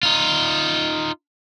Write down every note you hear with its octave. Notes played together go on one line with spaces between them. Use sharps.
D#4 F4